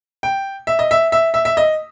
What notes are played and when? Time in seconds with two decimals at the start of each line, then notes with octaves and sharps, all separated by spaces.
0.23 G5
0.67 E5
0.79 D#5
0.91 E5
1.12 E5
1.34 E5
1.45 E5
1.57 D#5